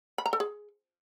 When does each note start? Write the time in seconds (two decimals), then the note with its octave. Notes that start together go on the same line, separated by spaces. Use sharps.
0.18 B5
0.26 A#5
0.33 A4
0.40 G#4